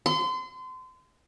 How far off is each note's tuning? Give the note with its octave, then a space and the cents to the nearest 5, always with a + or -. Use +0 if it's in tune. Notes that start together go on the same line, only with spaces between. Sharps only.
C6 -30